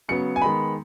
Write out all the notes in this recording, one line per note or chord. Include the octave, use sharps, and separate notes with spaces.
C#3 F#3 B3 C#7
G#5
D#3 G#3 B3 B5